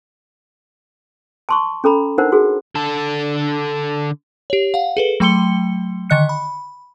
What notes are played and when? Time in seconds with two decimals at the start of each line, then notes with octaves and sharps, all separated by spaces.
1.49 A5 C6 C#6
1.84 C#4 A4 A#5 B5
2.18 D4 D#4 A#4 C5 F#5
2.32 F#4 G#4
2.75 D3 A4
4.50 G4 C#5
4.74 F5 F#5
4.97 G#4 A4 B4
5.20 F#3 A3 G5 C6 C#7 G7
6.10 D3 D#3 D#5 F#6 C#7
6.29 B5